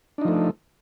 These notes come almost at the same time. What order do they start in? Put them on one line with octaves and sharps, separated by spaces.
D4 D#4 F3 A3